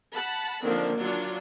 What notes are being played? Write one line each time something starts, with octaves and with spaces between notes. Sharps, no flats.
F#5 A5 B5
D3 D#3 F3 A#3 C4 D4
F#3 D4 F4